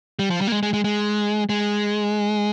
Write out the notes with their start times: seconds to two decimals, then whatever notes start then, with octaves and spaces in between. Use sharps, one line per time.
0.19 G3
0.30 F3
0.41 G3
0.47 A#3
0.52 G#3
0.63 G#3
0.74 G#3
0.84 G#3
1.49 G#3